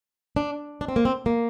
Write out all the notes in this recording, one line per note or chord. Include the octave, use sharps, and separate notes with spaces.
D4
D4
C4
A#3
C4
A#3